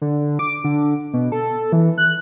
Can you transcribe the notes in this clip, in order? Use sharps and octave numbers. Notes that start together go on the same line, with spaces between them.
D3
D6
D3
B2
A4
E3
F#6